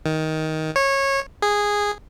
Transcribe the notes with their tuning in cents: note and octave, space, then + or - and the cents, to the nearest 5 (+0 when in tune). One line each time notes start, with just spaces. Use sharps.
D#3 +15
C#5 -20
G#4 -10